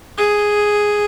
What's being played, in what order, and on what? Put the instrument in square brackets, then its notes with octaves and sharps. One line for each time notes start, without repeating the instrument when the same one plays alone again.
[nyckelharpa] G#4